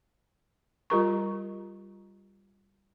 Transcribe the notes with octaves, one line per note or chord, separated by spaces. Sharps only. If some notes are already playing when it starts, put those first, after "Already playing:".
G3 F4 G4 A#4 A#5 C#6